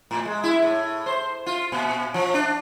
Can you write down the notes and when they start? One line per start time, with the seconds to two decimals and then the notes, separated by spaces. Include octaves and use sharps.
0.11 A2
0.26 G#3
0.43 E4
0.62 A2
1.06 C5
1.46 F4
1.72 A#2
2.14 F3
2.34 D4